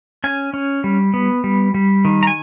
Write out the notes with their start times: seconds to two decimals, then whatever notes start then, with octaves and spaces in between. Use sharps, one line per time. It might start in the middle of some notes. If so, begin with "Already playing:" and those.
0.24 C#4 G#5
0.54 C#4
0.84 G3
1.14 B3
1.44 G3
1.74 G3
2.05 D#3
2.23 A#5
2.27 G#5